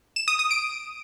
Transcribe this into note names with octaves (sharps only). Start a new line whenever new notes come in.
E7
D#6
D#6
D7